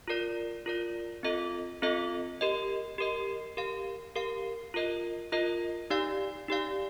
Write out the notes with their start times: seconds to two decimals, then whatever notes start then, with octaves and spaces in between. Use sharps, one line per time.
0.08 F4 A#4 D5
0.66 F4 A#4 D5
1.23 C4 F4 A4 D#5
1.82 C4 F4 A4 D#5
2.41 G4 A#4 D#5
2.98 G4 A#4 D#5
3.57 G4 A#4 F5
4.16 G4 A#4 F5
4.74 F4 A#4 D#5
5.32 F4 A#4 D#5
5.90 D#4 G4 D5 F5
6.48 D#4 G4 D5 F5